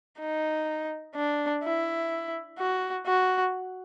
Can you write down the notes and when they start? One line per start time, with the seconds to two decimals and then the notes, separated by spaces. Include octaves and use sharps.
0.20 D#4
1.15 D4
1.64 E4
2.58 F#4
3.06 F#4